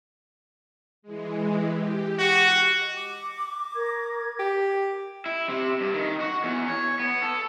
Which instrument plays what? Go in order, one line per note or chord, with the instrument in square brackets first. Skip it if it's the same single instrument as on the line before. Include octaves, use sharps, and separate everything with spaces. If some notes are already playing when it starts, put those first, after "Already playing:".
[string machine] E3 G#3
G4
[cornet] F#4
[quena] D#5
D6
[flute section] A#4 G#6
[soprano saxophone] G4
[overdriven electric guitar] E4
C3
G2
D#3
F#4
E2
C#5
B3
A4